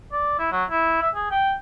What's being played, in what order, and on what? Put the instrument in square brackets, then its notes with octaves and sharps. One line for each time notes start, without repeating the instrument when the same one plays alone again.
[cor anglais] D5
E4
F#3
E4
E5
G#4
G5